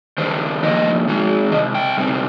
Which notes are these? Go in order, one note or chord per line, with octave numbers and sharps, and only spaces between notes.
D#3 G3 D4 C5
F3 A#3 D#4 D#5
D#3 G#3 D#4
C3 G3 D#5
G5
C3 G3 C4 D#4